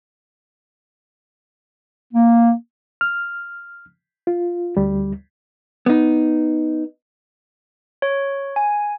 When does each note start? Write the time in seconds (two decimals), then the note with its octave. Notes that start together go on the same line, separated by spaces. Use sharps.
2.14 A#3
3.01 F6
4.27 F4
4.77 D2 G3
5.86 B3 D#4
8.02 C#5
8.56 G#5